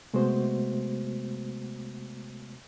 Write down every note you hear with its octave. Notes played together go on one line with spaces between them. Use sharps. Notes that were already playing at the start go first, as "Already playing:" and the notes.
C3 G#3 A3 B3 F#4 C5